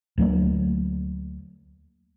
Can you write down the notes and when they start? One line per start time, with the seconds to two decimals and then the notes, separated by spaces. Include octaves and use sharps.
0.18 D2 F#3 A3 A#3